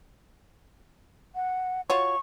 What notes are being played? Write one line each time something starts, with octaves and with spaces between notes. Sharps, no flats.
F#5
F4 F#4 C#5 C#6